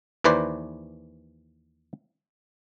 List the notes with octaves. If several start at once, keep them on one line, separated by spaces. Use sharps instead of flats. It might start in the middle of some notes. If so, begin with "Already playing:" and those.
D#2 E3 B4 C5 D5